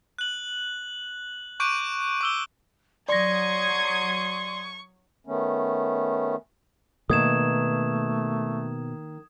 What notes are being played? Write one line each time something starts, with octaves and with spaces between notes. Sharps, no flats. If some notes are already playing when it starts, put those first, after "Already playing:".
F#6 F#7
C#6 D6 F#6 G6 D7 D#7
D6 E6 G7
F#3 D5 C6 C#6 D#6 G#6 A#6
D#3 A3 B3 C#4
B2 D#3 A3 A#3 D#6 G#6 E7